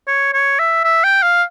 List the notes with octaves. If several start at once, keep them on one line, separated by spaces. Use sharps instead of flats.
C#5
C#5
E5
E5
G5
F5